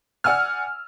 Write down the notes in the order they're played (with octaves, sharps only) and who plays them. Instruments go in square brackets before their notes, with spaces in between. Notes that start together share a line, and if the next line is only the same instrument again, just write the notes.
[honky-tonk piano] D5 F#5 G#5 E6 F6